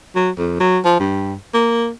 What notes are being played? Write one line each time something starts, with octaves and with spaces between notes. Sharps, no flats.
F#3
F2
F#3
F3
G2
A#3